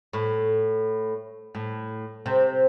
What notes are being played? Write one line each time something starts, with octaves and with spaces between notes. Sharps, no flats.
A2
A2
C3